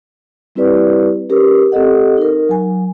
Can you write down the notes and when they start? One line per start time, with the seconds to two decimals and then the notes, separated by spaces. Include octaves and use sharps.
0.55 G3 C4 E4 G4 B4 D5
1.30 C#4 G4 A#4 B4
1.72 C4 G4 A4 D#5 F#5
2.18 D#4 A#4
2.49 F#3 G#5